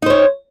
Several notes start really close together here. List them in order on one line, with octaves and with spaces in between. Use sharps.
D#4 C5 C#5